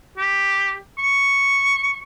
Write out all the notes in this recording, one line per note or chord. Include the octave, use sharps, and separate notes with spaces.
G4
C#6